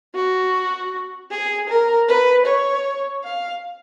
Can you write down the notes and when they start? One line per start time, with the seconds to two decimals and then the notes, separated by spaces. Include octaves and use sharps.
0.15 F#4
1.31 G#4
1.69 A#4
2.08 B4
2.46 C#5
3.24 F5